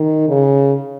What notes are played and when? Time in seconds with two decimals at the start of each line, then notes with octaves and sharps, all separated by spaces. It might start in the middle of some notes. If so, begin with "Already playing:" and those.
Already playing: D#3
0.29 C#3